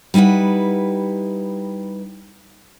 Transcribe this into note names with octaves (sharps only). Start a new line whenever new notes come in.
G3 D#4 E4 B4 F#5